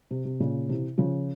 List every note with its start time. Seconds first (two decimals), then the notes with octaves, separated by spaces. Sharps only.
0.11 C3
0.25 C3
0.40 A#2 C#3
0.69 C3 E3
0.98 C#3 F3